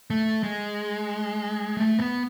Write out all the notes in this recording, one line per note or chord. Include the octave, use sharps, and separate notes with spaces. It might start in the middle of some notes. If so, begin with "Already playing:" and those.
A3
G#3
A3
B3